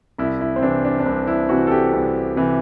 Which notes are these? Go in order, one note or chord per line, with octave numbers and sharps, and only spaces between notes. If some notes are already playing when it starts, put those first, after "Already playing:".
C2 E4
E4
C4
C3 E3 D4
D4
D4
C2 C4
E4
C3 E3 F#4
A4
G4
C2
C3 E3